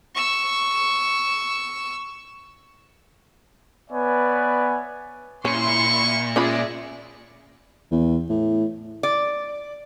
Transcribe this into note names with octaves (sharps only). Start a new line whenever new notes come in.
C#6 E6
B3 B4 C#5 D5 E5 G#5
A#2 C#4 E4 C6 C#6
G#3 C#4 F4 G#4 D5 E5 B5
E2
A2
D5